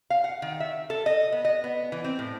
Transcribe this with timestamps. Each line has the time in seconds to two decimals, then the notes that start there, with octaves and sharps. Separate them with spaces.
0.10 F5
0.24 F#5
0.42 D#3
0.60 E5
0.90 A4
1.06 D#5
1.32 B3
1.45 D#5
1.64 B3
1.92 E3
2.04 C4
2.19 A2